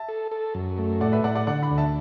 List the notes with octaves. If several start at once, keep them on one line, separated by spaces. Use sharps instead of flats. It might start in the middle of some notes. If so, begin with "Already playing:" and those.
Already playing: E5 A5
A4
A4
F#2
A3
A2 D5 F#5
B4 E5
A2 D5 F#5
D5 F#5
D3 D5 F#5
F#5 B5
D2
E5 A5